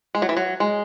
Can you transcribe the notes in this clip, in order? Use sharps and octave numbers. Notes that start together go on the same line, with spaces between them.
G#3
F#3
E3
F#3
G#3